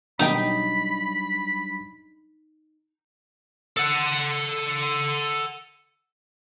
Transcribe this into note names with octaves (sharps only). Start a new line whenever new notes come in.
B2 D#3 F#3 G3 D4 D#4 G5 B5
A4 F#5